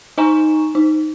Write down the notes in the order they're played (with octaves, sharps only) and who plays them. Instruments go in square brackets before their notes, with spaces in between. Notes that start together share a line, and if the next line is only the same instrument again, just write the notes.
[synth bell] D#4 D#5 G#5 A#5 C#6 E7
D#4